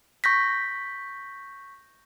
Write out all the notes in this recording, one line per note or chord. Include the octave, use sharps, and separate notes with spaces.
C#6 G6 A#6 B6